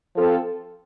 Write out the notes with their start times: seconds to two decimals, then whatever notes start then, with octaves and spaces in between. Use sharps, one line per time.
0.15 F3 C4 F4 A4